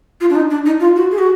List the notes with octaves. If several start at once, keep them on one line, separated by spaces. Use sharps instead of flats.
F4
D4
D#4
D4
D#4
F4
F#4
G#4
F#4